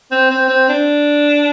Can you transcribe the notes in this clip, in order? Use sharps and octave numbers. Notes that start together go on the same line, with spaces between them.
C4
C4
C4
D4